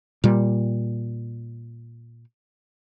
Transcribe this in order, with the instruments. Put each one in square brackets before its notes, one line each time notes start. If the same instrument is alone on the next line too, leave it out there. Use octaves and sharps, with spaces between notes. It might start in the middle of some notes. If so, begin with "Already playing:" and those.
[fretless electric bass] A#2 G3